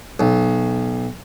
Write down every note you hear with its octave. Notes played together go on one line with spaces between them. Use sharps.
B1